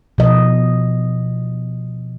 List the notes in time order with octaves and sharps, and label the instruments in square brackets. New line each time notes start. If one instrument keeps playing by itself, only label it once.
[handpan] B2 F3 D#5